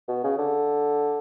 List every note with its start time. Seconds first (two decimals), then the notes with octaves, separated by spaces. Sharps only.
0.09 B2
0.24 C#3
0.38 D3